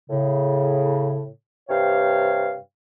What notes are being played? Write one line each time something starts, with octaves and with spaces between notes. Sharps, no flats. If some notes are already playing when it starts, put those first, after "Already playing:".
A2 C#3
G2 C3 C#5 F5 G5